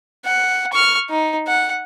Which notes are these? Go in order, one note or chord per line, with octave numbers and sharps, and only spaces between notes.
F#5
C#6 F6
D#4
F#5